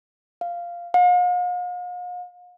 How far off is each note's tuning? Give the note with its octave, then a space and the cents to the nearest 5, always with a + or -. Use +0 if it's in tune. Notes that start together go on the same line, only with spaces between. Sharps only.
F5 -5
F5 +45